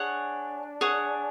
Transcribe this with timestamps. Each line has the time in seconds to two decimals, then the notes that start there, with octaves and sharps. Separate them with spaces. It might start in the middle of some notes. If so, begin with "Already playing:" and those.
Already playing: D4 G#4 C#5 F#5
0.81 G#4 C#5 F#5